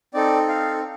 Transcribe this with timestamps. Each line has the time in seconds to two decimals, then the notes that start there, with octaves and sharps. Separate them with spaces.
0.14 C4 D#4 A4 D5
0.48 F5